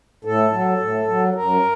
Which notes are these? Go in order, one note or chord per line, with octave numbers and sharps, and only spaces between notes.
A2 A4
F#3
A2
F#3
F#2 A#4